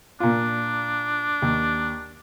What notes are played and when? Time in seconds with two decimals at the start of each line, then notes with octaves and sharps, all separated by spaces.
0.20 A#2 D4 F4
1.42 D#2